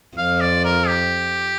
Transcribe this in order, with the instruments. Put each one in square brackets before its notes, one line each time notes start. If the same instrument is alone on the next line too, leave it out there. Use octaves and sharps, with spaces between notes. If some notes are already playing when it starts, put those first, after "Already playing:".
[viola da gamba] F2 F3 [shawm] F5
[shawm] D5
A#4
G4